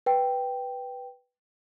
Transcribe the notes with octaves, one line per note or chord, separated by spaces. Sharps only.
B4 G5